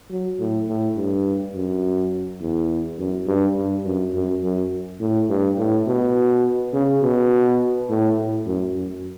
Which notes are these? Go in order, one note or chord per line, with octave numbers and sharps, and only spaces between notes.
F#3
A2
A2
G2
F#2
E2
F#2
G2
G2
F#2
F#2
F#2
A2
G2
A2
B2
C#3
B2
A2
A2
F#2
F#2